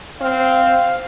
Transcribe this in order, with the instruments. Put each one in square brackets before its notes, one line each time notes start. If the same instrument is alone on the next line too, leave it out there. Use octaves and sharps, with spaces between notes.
[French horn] C4 [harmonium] F5